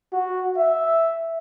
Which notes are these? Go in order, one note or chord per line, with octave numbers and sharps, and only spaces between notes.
F#4
E5